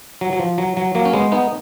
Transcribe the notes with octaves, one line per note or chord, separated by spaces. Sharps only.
F#3
F#3
F3
F#3
F#3
F#3 A#3
C#4
G#3 B3
B3 D#4